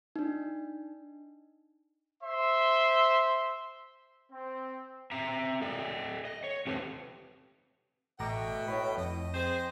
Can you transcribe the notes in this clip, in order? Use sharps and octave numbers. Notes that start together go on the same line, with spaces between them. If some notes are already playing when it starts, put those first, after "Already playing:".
D4 D#4
C5 E5 C6
C4
C4 E5 A#5
A4 D5 D#5
D#5
C#5
C4 G4 A4 B4 C5
A1 B2 A3 G5 A#5 D6
A2 C#5 B5
F2 D#5
C4 G#4 C5